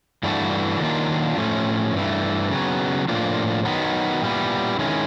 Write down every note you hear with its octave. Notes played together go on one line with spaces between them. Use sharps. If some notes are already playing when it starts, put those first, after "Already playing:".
G2 E3 A3 D4 F#4
D#3 F#3 A#3 D4 F4
A2 F3 A3 C#4
G2 E3 A3
C#3 F#3 B3
A2 F3 A#3 D4 F4
D#3 F#3 B3 D#4
A#2 G3 B3 E4
D#3 G#3 C#4 E4